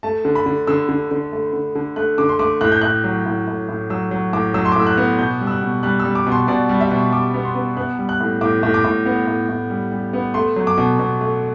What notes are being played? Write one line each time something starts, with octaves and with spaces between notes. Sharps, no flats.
A3 A5
D3
B5
D3
D3 E6
D3
D3
A3
D3
D3
A3 F#6
D3 D6
C6
A3 D6
A2 F#6
G6
A2 F#6
F#3
A2
A2
A2
F#3 E6
F#3
A2 D6
F#3 E6
C6
D6
A2 E6
F#6
B3
B2 G6
G3
E6
F#6
B2
G3 F#6
E6
G3
D6
B2 C6
B2 D5
G3
E5
B2
G3 D6
B3
C6
B3
B3 F#6
G3
F#6
A2
A2 D6
A2
D6
A2
B3
A2
A2
G3
G3
B3
A3 C6
F#3
D6
B2
B2
A3